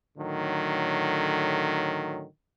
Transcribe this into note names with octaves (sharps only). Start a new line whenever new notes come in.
A2 D3 D#3 F#3